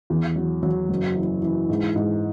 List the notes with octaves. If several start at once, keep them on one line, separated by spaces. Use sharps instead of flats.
E2
F#3
F#3
F#1
E3
E3
G#2
G#2